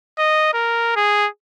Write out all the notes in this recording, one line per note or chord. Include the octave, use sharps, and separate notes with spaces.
D#5
A#4
G#4